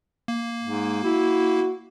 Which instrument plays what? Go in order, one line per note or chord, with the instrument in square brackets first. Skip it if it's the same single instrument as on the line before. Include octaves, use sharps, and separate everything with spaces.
[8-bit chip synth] A#3
[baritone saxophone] G#2
[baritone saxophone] E4 [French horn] F#4